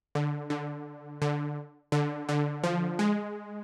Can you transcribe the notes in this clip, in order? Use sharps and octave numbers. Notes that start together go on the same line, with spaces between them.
D3
D3
D3
D3
D3
F3
G#3